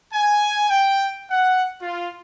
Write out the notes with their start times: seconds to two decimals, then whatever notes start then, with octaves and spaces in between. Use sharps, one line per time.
0.12 G#5
0.69 G5
1.31 F#5
1.82 F4